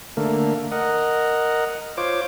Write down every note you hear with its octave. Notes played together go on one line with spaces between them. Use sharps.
D3 A3 A#3
A#4 D#5 F#5
F4 C5 C#5 D6